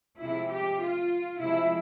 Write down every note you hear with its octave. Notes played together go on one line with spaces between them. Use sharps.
C3 F3 G#3 E4
G4
F4
C3 F3 G#3 E4